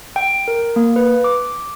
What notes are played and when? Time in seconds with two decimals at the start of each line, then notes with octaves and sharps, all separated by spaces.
0.16 G5
0.48 A#4
0.76 A#3
0.96 B4
1.24 D6